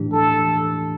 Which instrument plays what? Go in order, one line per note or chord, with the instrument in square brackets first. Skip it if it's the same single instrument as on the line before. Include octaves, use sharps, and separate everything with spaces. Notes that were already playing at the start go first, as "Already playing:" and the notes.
Already playing: [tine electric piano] A2 E3 A3 D4 G4
[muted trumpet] A4